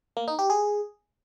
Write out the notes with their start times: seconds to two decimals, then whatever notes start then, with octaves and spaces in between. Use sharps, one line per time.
0.17 A#3
0.28 D#4
0.39 G4
0.50 G#4